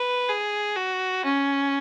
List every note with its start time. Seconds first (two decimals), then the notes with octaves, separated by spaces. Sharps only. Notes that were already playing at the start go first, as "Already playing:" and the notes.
Already playing: B4
0.29 G#4
0.76 F#4
1.24 C#4